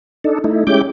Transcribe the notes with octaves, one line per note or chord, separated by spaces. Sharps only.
D4 D#4 A4
A3 D#4 E4
G#3 C#4 E4 G4 D6 G6